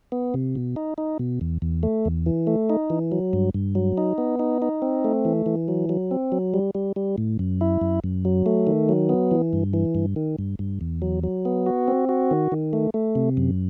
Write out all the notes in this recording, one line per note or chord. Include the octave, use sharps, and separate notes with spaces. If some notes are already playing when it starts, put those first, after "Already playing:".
B3
C3
B2
D#4
D#4
B2
E2
E2
A3
E2
E3
A3
D#4
E3
F#3
G2
G2
F#3
D#4
B3
D#4
D#4
C4
A3
E3
E3
F#3
F#3
C4
F#3
G3
G3
G3
A2
F#2
E4
F#2
F#2
F#3
A3
D#3
F#3
B3
E3
G2
E3
G2
D#3
G2
G2
E2
F#3
F#3
B3
F#4
C4
F#4
D#3
D#3
A3
A3
C3
F#2